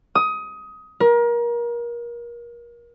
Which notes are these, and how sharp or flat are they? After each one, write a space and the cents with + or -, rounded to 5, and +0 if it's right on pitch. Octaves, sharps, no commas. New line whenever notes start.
D#6 +20
A#4 +30